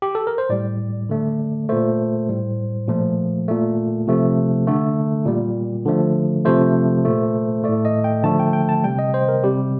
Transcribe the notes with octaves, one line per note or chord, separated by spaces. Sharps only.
G4
A4
A#4
C5
A2 G3 D5
D3 A3
A#2 A3 C5
A2 G3
A#2 F3 A3
A#2 A3
C3 F3 A3
D3 A3
A#2 G3
D3 F3 A3
C3 F3 A3 C5
A#2 A3
A2 A3 D5
D#5
G5
D3 F3 A3 A5
G5
G5
A5
C3 G3 G5
D#5
C5
A#4
C3 G3 G4